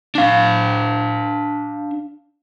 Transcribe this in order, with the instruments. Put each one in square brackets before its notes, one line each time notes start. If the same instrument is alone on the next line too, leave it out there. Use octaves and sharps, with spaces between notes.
[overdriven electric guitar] D4 F5